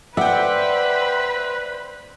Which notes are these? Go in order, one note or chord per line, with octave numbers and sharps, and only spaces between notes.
B4 C5 D5 E5 F#5 G5 B5